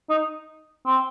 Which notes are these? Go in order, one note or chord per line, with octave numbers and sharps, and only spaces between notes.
D#4
C4